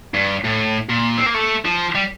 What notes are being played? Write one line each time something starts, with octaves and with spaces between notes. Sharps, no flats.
G2
A2
A#2
C4
A#3
A3
F3
G3